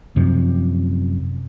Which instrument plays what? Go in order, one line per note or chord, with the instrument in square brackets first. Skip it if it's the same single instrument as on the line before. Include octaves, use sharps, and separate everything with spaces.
[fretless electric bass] F#2 C3 F3